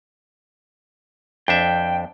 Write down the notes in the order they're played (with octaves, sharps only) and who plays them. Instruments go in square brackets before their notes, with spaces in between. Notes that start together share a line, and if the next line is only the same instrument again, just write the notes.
[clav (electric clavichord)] F2 D4 E5 [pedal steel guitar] G5